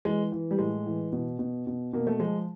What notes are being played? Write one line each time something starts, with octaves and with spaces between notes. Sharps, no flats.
E3 G#3
E3
G3
A2 G#3
E3
B2
B2
B2
B2 A#3
A3
F3 G#3